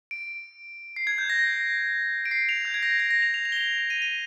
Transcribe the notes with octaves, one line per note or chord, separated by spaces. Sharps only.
D7
C7
G#6
G6
A#6
D7
C7
F7
G6
G#6
A#6
G#6
A#6
A#6
F7
F7
F7
G7
F7
G7
F7
D#7
D#7